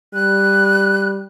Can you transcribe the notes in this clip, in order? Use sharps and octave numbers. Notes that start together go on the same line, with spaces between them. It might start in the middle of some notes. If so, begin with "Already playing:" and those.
G3 F#6